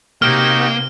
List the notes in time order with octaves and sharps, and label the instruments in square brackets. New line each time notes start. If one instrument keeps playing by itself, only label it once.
[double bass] C3 [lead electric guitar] A#3 [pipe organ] D#4 F#4 G4 [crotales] F6